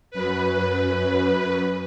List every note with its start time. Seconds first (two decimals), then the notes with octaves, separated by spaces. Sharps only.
0.11 F#2 B4